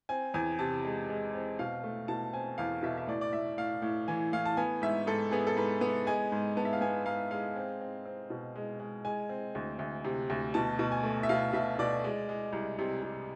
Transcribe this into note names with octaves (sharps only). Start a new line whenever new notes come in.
C4 G#5
E2 G#5
C3 A5
G#3
G#3
C4
B2 F5
A3
B2 A5
C4 G#5
E2 F5
B2 E5
E5
A2 D5
D5
A2 E5
A2 F5
A2
E3 G#5
A2 F5
A5
B3 G#5
G#2 E5
G#2 A4
B3 G#4
A4
G#2 B4
B3
G#3 G#5
G#2
B3 A5
E5
F5
B3 G#5
G#2 F5
G#3 F5
C4
C4
C4
B2
G#3
G#3
G#3 G#5
C4
D2
D2
C3
D2
B2 A5
B2
G#5
A3
E5
B2 F5
B2 E5
B2 D5
G#3
G#3
C2
C3
C3